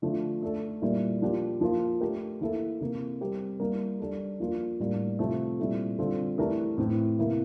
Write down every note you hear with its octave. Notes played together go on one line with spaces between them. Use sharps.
D3 F3 A3
A3 D4 A4
A#2 G3 A#3 E4
F3 A#3 D4 G4
F3 A#3 F4
A3 D4 G4 A#4
E3 A#3 E4 A4
C3 E3 A#3
G3 C4 G4 A#4
G3 A#3 E4 A#4
G3 D4 A4
F3 A#3 D4 F4
A2 G3 A#3 D4
C3 F3 A3 C4
A#2 G3 C4 E4 A4
D3 G3 C4 F4 A4
E3 A3 D4 G4 A#4
A2 E3 A3 C4
C3 E3 A#3 E4